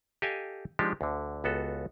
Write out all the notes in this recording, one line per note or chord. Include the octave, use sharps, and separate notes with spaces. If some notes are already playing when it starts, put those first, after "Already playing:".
G4 A4 D#5 F5 G#5
F3 G#3 D4 D#4 G4
D2 D3
C#2 B3 F#4 A4